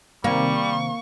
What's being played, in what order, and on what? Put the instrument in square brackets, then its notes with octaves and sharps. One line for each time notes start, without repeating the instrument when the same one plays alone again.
[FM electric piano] C3 D#3 C4 [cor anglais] G3 [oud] A#3 [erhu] C#6